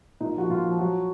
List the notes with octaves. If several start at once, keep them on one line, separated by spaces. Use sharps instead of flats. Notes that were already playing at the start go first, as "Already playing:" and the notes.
A#2 D#4
F3 F#4
A#2 F4
F3
F#3 F#4